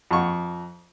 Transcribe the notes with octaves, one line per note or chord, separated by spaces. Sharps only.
F2 C#6